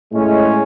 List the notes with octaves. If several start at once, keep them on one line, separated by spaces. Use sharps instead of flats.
A2 G#3 C#4